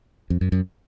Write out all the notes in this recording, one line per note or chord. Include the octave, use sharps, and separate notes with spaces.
F2
F#2
F#2